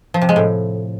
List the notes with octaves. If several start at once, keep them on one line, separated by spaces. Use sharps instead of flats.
F3
C3
G#3
A2